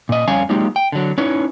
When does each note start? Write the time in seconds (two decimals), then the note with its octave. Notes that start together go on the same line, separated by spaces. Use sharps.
0.09 A#2 D#5
0.28 F2 G3 C#4 C#5 F5 G#5
0.49 F#3 G#3 A#3 D#4 F4 G4
0.76 G5
0.92 D3 F#3
1.18 C#4 D#4 E4 B4 C#5